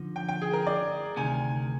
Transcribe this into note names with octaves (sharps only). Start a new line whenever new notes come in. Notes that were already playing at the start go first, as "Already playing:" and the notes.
Already playing: D3 F3 D#4
G5
G5
G#4
A#4
D5
D2 C3 D#3 G#5